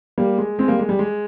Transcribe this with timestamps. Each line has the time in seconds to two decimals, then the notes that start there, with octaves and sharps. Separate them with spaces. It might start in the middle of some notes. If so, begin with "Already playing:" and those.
0.18 G3 A#3
0.38 G#3
0.59 G#3 C4
0.68 G3 A#3
0.79 G#3
0.89 G3
0.99 G#3